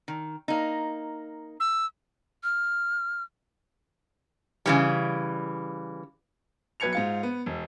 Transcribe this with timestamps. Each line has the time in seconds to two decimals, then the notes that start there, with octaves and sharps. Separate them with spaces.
0.08 D#3
0.48 A#3 D#4
1.60 E6
2.43 F6
4.66 C#3 E3 G3
6.80 B1 B4 G#6 C#7 F7
6.93 G#2 F4 C#7
7.23 B3
7.46 E1